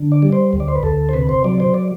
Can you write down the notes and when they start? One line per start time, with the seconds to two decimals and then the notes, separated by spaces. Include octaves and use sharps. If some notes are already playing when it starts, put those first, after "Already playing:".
Already playing: D3
0.12 D5
0.22 G3
0.33 C5
0.53 D2
0.60 D5
0.68 C5
0.75 B4
0.83 D2 A4
1.09 C5
1.13 C3 B4
1.29 C5
1.44 F#3 D5
1.60 C5
1.74 D5